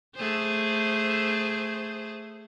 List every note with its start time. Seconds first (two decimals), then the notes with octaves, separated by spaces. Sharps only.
0.15 A3 G#4 C5